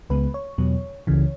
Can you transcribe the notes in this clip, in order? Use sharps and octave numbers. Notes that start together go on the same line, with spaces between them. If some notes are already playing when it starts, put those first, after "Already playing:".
C#2 C#3 G#3 B3 B4
C#5
E2 B2 F#3 B3
C#2 C#3 E3